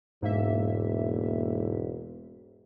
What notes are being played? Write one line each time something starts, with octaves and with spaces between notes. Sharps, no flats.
E1 G#2 A#3 E5